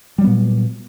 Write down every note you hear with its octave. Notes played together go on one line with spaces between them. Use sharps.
A#2 F#3 G3 B3